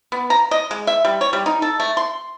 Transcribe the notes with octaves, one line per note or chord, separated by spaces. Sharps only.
B3
A#5
D#5
G#3
E5
G3
C#5
G3
D#4
A4
A3
C6